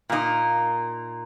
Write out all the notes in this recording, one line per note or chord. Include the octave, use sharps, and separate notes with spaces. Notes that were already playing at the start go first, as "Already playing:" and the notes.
A#2 A#3 D#4